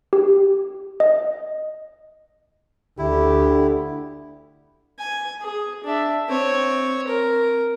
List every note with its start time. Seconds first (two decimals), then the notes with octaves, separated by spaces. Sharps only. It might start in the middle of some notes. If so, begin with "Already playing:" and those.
0.13 G4
1.00 D#5
2.98 D2 D3 E4 G4
4.99 G#5
5.41 G#4
5.84 D4 E5
6.28 C4 C#5
7.08 A#4